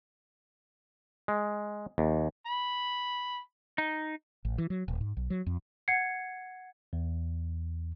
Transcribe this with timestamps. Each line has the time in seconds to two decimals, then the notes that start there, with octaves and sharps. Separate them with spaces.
1.28 G#3
1.98 D#2
2.46 B5
3.78 D#4
4.45 A1
4.58 E3
4.70 F#3
4.88 D#1
5.01 G#2
5.17 B1
5.30 F#3
5.46 F2
5.88 F#5 G#6 C7 C#7
6.93 E2